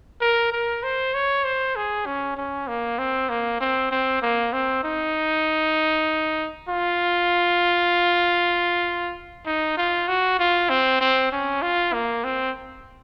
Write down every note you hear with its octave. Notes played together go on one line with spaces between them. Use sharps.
A#4
A#4
C5
C#5
C5
G#4
C#4
C#4
A#3
C4
A#3
C4
C4
A#3
C4
D#4
F4
D#4
F4
F#4
F4
C4
C4
C#4
F4
A#3
C4